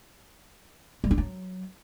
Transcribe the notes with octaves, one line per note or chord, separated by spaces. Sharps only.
G3
D4
F#3